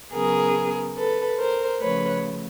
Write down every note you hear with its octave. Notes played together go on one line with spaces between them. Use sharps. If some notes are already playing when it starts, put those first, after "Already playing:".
C#3 F#3 B3 G#4 A#4
A4 B4
A#4 C5
C#3 F3 A3 B4 C#5